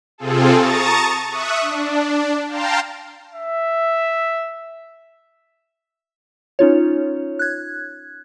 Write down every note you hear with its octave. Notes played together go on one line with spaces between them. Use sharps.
C3 C4 F4 G#4 A4
A5 A#5 C#6 D#6 A6
E5 C#6 D#6 F#6
D4
F5 G5 A5 A#5 C6
E5
C#4 D#4 F4 C#5
F#6 G#6